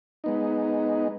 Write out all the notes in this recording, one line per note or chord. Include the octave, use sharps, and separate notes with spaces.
G#3 B3 D#4